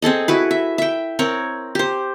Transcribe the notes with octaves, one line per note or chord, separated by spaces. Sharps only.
C4 G#4 A4 D#5
E4 F#4 B4
E5
E5 G5
C4 A#4 C#5
G4 C5